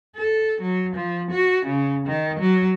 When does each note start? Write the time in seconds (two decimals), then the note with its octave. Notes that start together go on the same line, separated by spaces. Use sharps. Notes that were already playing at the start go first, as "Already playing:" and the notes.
0.17 A4
0.62 F#3
0.96 F3
1.32 F#4
1.66 C#3
2.07 D#3
2.40 F#3